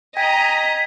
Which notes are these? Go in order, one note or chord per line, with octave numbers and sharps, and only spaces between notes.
D#5 G5 G#5 A#5 D#6 B6